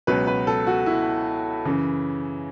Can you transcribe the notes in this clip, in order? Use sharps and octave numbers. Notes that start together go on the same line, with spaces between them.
C#2 B2 F#3 B3 B4
B4
A4
F#4
E4
F#2 C#3 E3